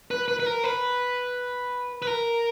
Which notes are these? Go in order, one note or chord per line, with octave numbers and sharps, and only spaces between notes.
B4
B4
B4
A#4
B4
B4
A#4